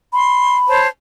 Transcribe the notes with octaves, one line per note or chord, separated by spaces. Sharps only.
B5 C6
C5 C#5 A5